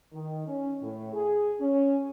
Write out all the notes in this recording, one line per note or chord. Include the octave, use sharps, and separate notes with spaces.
D#3
C#4
A2
G#4
C#4